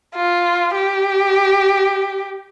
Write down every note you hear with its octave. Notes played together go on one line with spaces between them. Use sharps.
F4
G4